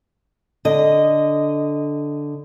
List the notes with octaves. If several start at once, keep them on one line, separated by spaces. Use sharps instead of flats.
D3 D#5